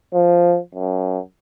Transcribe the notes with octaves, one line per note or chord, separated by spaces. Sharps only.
F3
F#2